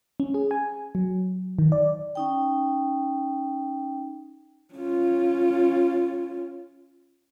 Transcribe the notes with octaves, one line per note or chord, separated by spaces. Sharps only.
C#4
G#4
G#5
F#3
D#3
D5
C#4 D#4 G5
C#4 F4